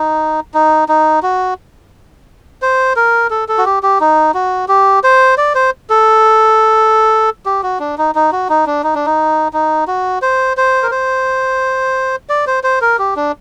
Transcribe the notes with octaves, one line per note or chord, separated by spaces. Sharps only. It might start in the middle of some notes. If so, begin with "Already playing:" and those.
Already playing: D#4
D#4
D#4
F#4
C5
A#4
A4
A4
F#4
G4
G4
D#4
F#4
G4
C5
D5
C5
A4
G4
F#4
D4
D#4
D#4
F#4
D#4
D4
D#4
D4
D#4
D#4
F#4
C5
C5
A#4
C5
D5
C5
C5
A#4
G4
D4